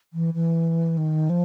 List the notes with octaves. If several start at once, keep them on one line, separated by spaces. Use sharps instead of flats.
E3
E3
D#3
F3